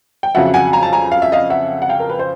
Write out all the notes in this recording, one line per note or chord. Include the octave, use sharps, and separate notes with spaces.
G5
F2 C#3 F#3 E5 F#5
F#5 G#5
G#5 A#5
A5
G#5 A#5
F5
E5
D#5 F5
E5 F#5
F#5
F5 G5
A#4
B4
C5